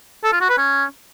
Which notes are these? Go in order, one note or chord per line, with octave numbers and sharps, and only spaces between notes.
A4
F4
F#4
B4
C#4